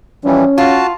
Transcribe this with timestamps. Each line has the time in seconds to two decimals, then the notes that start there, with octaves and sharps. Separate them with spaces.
0.25 E3 F3 G3 C#4
0.58 F4 F#4 A5